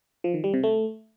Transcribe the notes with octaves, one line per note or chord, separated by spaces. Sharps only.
F3
D#3
G3
C3
A3